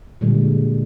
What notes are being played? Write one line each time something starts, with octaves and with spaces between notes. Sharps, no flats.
A#2 D3 G3 G#3